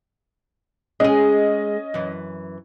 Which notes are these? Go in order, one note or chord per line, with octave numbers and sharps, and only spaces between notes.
G#3 C#4 G#4 D#5
F#2 E3